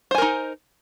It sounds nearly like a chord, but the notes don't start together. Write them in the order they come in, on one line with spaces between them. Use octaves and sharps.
C5 G#5 A#4 D#4